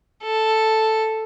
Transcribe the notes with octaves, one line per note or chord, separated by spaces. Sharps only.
A4